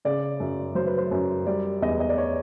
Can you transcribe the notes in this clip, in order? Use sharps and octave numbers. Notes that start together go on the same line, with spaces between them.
C#3 D5
F#2
F#3 C5
B4
C5
F#2
G3 D5
E2 D#5
D#5
D5
C#5